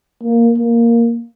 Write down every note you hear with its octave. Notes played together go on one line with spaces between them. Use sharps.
A#3
A#3